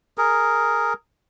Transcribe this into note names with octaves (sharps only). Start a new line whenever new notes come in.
G#4 A#4